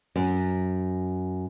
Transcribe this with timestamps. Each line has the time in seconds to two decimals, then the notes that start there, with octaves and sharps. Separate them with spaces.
0.16 F#2